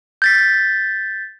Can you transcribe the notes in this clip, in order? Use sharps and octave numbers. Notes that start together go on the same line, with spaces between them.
G6 A6 B6